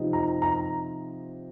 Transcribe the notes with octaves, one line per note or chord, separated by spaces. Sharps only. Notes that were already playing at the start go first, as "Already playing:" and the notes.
Already playing: C3 F3 C4 D#4
A#5
A#5